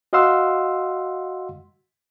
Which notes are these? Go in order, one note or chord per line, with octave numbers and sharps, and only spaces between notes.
F#4 D#5 F5 F#5 C6 E6